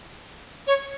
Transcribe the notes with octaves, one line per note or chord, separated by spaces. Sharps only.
C#5